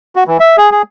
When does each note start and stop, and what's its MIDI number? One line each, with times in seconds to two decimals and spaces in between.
0.16 0.24 66
0.27 0.37 52
0.40 0.56 76
0.57 0.70 68
0.71 0.82 68